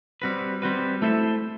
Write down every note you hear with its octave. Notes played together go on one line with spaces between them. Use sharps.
G3 C4 F#4 B4
G3 C4 F#4 B4
A3 E4 A4 C5 E5